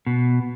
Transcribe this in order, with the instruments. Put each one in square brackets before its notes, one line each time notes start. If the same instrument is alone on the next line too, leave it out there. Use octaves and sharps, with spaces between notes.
[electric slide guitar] B2